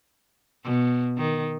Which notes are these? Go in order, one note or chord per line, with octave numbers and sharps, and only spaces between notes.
B2
D#3